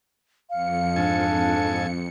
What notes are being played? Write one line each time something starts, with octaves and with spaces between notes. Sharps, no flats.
F2 F5 C#7
G#2 D4 A4 G#5